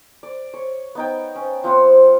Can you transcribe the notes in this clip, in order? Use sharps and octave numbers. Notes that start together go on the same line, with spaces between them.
D5
C#5
B3 D#4 G5
C#4
F3 C4 F#5 B5